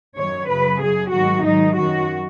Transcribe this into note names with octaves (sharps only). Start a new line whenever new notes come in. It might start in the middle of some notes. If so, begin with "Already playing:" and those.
F#2 D#3 F#3 C#5
F#2 C#3 F#3 B4
F#2 F#3 G#4
G#2 D#3 F#3 F#4
G#2 D#3 F#3 D#4
F#2 D#3 F#3 F#4